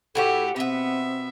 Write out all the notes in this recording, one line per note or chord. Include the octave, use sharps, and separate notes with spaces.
A2 F#4 G4 A4 E5
B2 B3 C4 E5